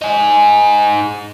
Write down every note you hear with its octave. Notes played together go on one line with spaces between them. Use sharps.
D#4 G#4